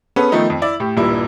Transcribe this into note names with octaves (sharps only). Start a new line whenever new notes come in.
B3 C#4 G#4 A4 B4
D#3 F3 A3 B3 D#4
F2
E4 D5
A2 G4
D#1 G2 A#2 G3 E4